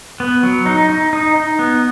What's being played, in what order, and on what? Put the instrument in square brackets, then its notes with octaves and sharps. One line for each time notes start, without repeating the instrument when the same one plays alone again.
[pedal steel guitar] B3
F#3
D#4
D#4
D#4
D#4
B3